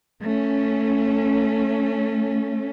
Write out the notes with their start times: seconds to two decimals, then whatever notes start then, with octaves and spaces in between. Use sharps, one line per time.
0.24 A3 C#4